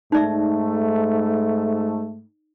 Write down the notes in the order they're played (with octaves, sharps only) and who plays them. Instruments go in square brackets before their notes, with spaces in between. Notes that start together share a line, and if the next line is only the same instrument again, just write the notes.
[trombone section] G#2 A3 [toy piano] D#4 D5 E5